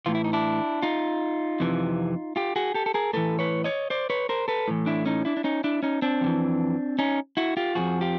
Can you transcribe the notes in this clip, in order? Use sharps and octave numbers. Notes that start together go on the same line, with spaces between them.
A2 E3 F4
E4
D#4
D4 E4
D#4 F4
F2 C3 E3
F4 G4
F#4 G#4
G4 A4
A4
G#4 A#4
A2 E3 A4 B4
B4 C#5
C#5 D#5
C5 D5
B4 C#5
A#4 C5
A4 B4
A2 E3
D4 E4
C#4 D#4
D4 E4
D4
C#4 D#4
D4 E4
C#4 D#4
C4 D4
F2 C3 E3
C#4 D#4
E4 F#4
F4 G4
F2 C3 F3 F#4 G#4
F4 G4